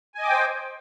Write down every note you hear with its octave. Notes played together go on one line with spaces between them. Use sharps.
C5 D#5 G5 G#5 D6